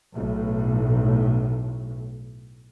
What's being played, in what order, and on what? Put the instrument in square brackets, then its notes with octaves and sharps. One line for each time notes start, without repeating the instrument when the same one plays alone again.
[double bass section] B1 A2